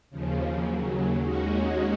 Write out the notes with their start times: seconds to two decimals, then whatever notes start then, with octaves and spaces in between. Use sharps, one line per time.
0.10 D#2 C#3 F3
0.64 D#2 C#3 F#3
1.18 D#2 D#3 G#3 C#4 F#4